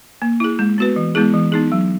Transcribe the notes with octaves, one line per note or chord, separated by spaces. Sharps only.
A#3
E4 G#4
G#3
B3 F#4 B4
E3
G#3 B3 E4 G#4
E3
B3 D#4 G#4
F#3